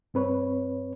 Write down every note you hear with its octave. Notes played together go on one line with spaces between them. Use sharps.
G2 C4 B4 C#5